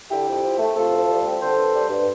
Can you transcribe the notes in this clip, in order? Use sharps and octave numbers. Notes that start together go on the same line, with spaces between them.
D3 E4 G4
F2
F3
A3
C3 F4 A4
D2
G3
C4
D3 A4 C5
G2
G3
G2